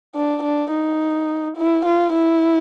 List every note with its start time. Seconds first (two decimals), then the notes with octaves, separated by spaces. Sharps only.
0.15 D4
0.43 D4
0.71 D#4
1.57 E4
1.85 F4
2.13 E4